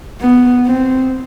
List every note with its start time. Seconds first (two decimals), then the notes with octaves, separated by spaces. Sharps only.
0.21 B3
0.66 C4